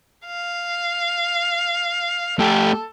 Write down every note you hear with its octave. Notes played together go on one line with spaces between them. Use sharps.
F5
A3 G4 A4